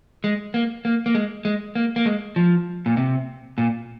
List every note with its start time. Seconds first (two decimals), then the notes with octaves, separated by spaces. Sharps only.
0.24 G#3
0.54 A#3
0.85 A#3
1.06 A#3
1.15 G#3
1.45 G#3
1.75 A#3
1.96 A#3
2.05 G#3
2.36 F3
2.86 A#2
2.97 C3
3.58 A#2